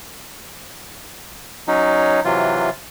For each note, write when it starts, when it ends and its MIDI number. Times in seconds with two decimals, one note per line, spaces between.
1.68 2.20 54
1.68 2.20 61
1.68 2.20 63
2.25 2.70 48
2.25 2.70 52
2.25 2.70 54
2.25 2.70 65